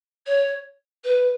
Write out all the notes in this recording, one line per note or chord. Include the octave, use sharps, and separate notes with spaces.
C#5
B4